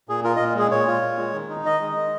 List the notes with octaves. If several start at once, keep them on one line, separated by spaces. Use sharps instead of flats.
A#2 G#4
F4 A#4
D#5
A#2
G#3 G#4
A#2 C#5
F4
A#2
G#3
D#3
D#4
D#3 D#5
G#3
D#3